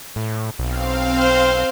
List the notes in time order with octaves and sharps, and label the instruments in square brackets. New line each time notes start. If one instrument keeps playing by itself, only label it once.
[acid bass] A2
[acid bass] B1 [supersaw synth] C4 F5
[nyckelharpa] C5